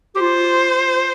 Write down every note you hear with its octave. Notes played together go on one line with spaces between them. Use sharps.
G4
F4 C5